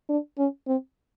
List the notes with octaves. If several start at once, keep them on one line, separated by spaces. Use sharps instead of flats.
D4
C#4
C4